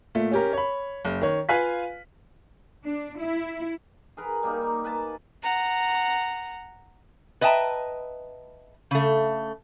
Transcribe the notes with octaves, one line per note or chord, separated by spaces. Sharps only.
A#2 A3
C#4 G4 A#4
C#5 B5
F#1
D#3 C#5
F4 B4 F5 G#5 F#6 B6
D4
E4
G#4 A#4 B4
G3 A#3 D#4
A#3
A#3 B4 G#5 A5
F#5 A#5
B4 D#5 E5 G5 A5 A#5
C#3 A3